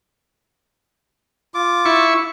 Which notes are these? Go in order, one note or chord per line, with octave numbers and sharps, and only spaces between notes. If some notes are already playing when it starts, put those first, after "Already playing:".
F4 D6
E4 C#6